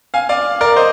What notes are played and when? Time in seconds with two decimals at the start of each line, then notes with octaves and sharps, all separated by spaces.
0.14 F5 G#5
0.29 D5 F5
0.61 A#4 D5
0.76 C5 D#5